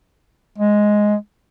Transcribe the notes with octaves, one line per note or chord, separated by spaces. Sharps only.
G#3